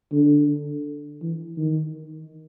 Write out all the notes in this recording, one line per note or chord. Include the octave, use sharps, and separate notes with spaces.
D3
E3
D#3